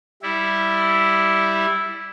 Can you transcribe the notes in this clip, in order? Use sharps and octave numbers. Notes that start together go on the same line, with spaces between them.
G3 E4